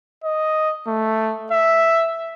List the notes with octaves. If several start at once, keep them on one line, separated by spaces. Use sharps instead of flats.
D#5
A3
E5